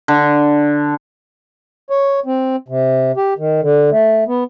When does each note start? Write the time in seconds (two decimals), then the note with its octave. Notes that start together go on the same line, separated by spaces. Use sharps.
0.08 D3
1.90 C#5
2.26 C4
2.68 C3
3.17 G4
3.38 D#3
3.62 D3
3.91 A3
4.27 B3